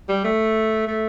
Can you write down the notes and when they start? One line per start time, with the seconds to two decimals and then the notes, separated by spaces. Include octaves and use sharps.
0.09 G3
0.24 A3
0.88 A3